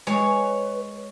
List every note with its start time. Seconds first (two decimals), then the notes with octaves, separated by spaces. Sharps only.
0.07 G#3 B4 C#5